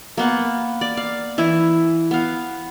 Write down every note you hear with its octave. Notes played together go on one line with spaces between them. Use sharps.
A#3 B3 F#5
D5
F5
E3 E4
B3 F5